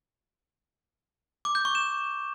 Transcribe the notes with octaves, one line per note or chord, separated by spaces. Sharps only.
D6
G6
C#6
E7